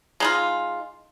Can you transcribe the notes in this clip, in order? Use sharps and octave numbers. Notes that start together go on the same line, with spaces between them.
G#3 D#4 F4